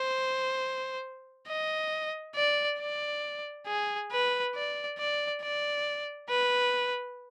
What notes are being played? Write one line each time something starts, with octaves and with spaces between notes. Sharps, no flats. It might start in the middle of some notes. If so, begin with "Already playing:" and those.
Already playing: C5
D#5
D5
D5
G#4
B4
D5
D5
D5
B4